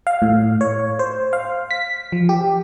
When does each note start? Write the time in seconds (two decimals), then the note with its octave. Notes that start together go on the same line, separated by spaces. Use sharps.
0.07 F5
0.22 A2
0.61 C#5
0.99 C5
1.33 F5
1.71 B6
2.12 F3
2.29 G4